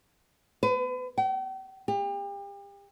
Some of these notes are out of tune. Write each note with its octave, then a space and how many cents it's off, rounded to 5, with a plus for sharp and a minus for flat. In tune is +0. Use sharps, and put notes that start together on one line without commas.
B4 +35
G5 -40
G4 +35